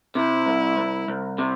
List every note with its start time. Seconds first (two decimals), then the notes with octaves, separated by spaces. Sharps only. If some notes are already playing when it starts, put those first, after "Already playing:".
0.15 C3 E4
0.46 C2
0.77 C2
1.08 C2
1.38 C3